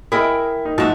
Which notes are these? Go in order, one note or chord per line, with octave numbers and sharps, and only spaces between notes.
E4 G#4 A#4 D#5 E5 G5
D#4
G#2 F3 D#4 F#4 E5 A5